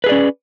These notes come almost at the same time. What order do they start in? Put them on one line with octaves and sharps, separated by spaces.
B4 G#4 D5 C#4